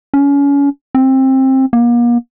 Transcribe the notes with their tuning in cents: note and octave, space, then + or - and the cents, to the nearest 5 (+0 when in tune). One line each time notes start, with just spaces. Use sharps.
C#4 +30
C4 +20
A#3 +40